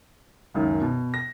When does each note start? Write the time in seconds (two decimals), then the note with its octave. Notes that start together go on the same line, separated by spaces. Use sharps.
0.54 C#2 F#2 D#3
0.81 B2
1.14 A#6